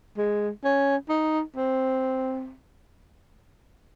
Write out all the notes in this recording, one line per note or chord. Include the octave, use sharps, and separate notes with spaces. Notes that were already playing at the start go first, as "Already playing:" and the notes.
G#3
C#4
D#4
C4